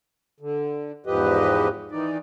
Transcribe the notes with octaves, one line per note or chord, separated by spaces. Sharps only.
D3
E2 G#2 F3 G4 B4 D#5
D#3 E3 D#4 D5